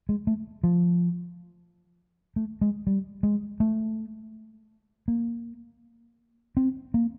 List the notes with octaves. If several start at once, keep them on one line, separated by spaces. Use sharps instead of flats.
G#3
A3
F3
A3
G#3
G3
G#3
A3
A#3
C4
A#3